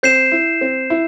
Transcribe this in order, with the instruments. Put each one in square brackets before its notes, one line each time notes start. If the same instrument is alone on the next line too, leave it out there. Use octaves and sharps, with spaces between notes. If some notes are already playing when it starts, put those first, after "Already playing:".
[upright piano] C4 [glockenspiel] G6 C7 E7
[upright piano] E4
C4
E4